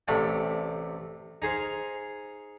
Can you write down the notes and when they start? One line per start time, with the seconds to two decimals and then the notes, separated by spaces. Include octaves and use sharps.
0.08 A1 C3 A3 D5 G5
1.42 D#4 G#4 C5 F5